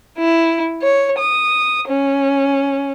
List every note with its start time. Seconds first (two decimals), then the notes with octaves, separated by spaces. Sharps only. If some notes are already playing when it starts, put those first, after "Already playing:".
0.18 E4
0.82 C#5
1.18 D#6
1.88 C#4